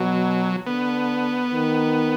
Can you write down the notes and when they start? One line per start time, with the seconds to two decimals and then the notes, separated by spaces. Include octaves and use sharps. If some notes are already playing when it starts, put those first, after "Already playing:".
Already playing: B2 F#3
0.67 D3 B3
1.53 D#3